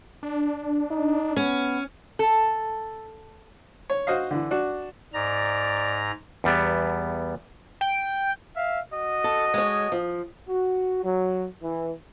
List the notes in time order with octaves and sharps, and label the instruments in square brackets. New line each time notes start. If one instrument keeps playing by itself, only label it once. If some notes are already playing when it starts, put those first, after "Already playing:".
[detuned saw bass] D4
[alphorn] D#4
[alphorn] B3 [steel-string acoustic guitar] C#4
[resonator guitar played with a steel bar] A4
[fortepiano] C#5
F#4 C5 D#5 F5
D3 E3
D4 F#4
[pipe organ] G#2 A#5 [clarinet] D5
[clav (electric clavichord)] E2 G3 B3
[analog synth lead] G5
[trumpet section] E5 F5
F#4 D#5
[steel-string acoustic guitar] A4
G#3 C#5
F3
[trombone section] F#4
F#3
E3